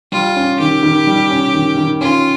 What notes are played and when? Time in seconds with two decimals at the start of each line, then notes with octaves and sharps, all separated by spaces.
0.12 G3 F4
0.36 C#4
0.60 D#3 G4
0.83 D#3
1.07 G3
1.30 C#4
1.54 D#3
1.77 D#3
2.01 C#4 F4